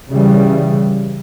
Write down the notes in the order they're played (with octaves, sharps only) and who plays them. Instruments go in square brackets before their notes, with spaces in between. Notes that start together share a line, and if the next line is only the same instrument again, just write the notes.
[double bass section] C#3 E3 G3